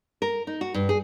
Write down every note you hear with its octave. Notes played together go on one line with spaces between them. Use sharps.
A#4
D#4
F#4
G2
G#4